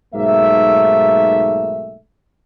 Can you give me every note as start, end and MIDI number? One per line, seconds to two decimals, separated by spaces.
0.14 1.97 35
0.14 1.97 44
0.14 1.97 57
0.14 1.97 58
0.14 1.97 76